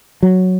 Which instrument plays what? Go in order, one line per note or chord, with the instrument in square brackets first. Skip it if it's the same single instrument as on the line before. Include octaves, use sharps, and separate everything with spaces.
[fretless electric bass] F#3